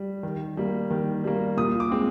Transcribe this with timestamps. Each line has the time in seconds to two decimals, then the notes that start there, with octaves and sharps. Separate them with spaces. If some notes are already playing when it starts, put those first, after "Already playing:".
Already playing: G3
0.23 D#3
0.57 G3 A#3
0.90 D#3
1.24 G3 A#3
1.57 A#2 D#6
1.80 D6
1.91 G#3 C4